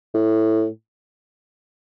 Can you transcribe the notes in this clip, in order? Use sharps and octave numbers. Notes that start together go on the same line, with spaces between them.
A2